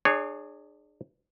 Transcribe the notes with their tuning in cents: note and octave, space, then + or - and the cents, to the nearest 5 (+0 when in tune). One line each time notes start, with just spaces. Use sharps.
D4 +35 G#4 +0 C#5 +0